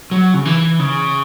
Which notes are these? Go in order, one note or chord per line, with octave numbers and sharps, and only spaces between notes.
F#3
C#3
E3
C#3